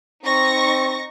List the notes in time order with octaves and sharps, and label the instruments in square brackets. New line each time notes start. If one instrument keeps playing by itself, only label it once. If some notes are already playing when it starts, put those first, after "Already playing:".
[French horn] C4 [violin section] D#4 C#6 A#6